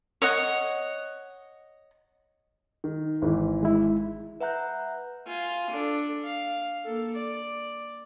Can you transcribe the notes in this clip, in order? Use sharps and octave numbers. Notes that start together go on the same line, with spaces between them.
C#5 D#5 F#5
D#3
G#1 E3
G#3 E4
B4 E5 F#5 A#5 F#6 G6
F4 G#5
D4 A4
F5
A#3 A4
D5